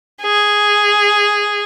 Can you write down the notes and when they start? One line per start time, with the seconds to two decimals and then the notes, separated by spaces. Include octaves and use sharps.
0.22 G#4